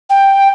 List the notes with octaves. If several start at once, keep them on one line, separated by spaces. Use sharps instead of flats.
G5